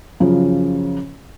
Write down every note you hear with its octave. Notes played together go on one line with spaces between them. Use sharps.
F#2 C#3 F3